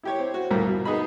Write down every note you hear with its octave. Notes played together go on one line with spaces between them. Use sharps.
E4 G4 C#5
C4
F#4
D2 G2 A#2 E3 A#3
B2
B3 D#4 G#4 D#5 B5